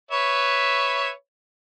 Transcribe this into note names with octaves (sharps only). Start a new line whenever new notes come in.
B4 C#5 E5